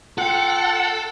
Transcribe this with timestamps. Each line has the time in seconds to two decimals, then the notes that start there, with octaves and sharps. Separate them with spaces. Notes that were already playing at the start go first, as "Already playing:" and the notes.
0.18 F4 A4 F#5 G5